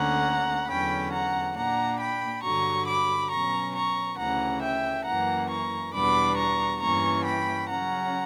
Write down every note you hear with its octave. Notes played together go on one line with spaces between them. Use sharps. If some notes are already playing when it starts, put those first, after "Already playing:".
Already playing: D2 D3 A#3 C#4 F#5 A#5
E2 D3 F#3 C#4 G5 B5
F#5 A#5
A#2 A#3 D4 F#5 A#5
G5 B5
G2 D3 F#3 A#5 C#6
B5 D6
B2 F#3 C#4 A#5 C#6
A#5 C#6
D2 C#3 E3 F#5 A#5
E5 G5
F#2 E3 A#3 F#5 A#5
A#5 C#6
E2 B2 G3 B3 D4 B5 D6
A#5 C#6
G2 E3 A#3 C#4 A#5 C#6
G5 B5
C#3 F#3 C#4 F#5 A#5